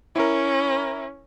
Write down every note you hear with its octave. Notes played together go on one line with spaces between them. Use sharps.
C#4 E4 A#4